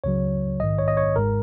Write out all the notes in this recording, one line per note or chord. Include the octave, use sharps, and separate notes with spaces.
C#2 C#3 F#3 C#5
A#1 G#2 D#3 D#5
C#5
D#5
C#5
G#1 G#2 G#3 A#4